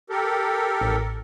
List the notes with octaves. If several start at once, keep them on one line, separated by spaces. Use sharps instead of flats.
G4 A4 A#4
A1